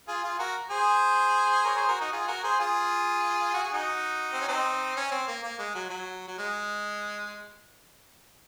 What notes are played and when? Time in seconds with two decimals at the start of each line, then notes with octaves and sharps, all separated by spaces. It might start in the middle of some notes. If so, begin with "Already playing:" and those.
0.08 F4 G#4
0.24 F4 G#4
0.39 F#4 A#4
0.71 G#4 C5
1.65 A#4 C#5
1.77 G#4 C5
1.88 F#4 A#4
2.01 D#4 F#4
2.13 F4 G#4
2.28 F#4 A#4
2.43 G#4 C5
2.60 F4 G#4
3.54 F#4
3.64 G#4
3.73 D#4 F#4
4.33 C4
4.41 C#4
4.48 C4 D#4
4.96 C#4
5.11 C4
5.27 A#3
5.43 A#3
5.59 G#3
5.75 F#3
5.90 F#3
6.28 F#3
6.38 G#3